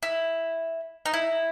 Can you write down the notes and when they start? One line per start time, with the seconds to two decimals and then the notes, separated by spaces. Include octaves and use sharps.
0.03 E4
1.06 D#4
1.13 E4